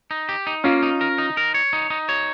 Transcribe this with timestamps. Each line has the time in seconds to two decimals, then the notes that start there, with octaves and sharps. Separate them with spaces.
0.11 D#4
0.29 G4
0.47 D#4
0.64 A#3 C#4 F4
0.83 D#4
1.01 A#4
1.18 D#4
1.37 A#4
1.54 C#5
1.73 D#4
1.90 D#4
2.09 C#5